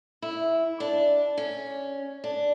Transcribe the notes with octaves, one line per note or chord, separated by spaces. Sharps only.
E4
D4
C#4
D4